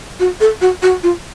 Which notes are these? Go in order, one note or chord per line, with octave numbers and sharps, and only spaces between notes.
F#4
A4
F#4
F#4
F4